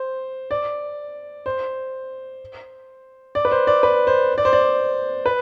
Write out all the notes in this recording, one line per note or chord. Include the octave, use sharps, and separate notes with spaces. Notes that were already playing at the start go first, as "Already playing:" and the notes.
Already playing: C5
D5
C5
D5
B4
C5
D5
B4
C5
D5
C5
D5
B4